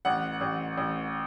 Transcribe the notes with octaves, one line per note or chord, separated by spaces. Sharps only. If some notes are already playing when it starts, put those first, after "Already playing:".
A1 F#5
A1
A1